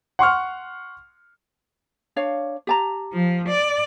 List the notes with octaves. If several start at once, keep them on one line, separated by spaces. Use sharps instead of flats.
F#5 C6 C#6 F6
D4 C#5 F5
G4 A5 A#5
F3
D5